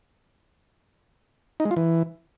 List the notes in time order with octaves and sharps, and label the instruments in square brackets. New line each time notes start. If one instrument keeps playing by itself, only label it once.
[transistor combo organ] D#4
G#3
F4
E3